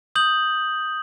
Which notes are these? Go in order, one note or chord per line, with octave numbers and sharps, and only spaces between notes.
D#6 G6 F#7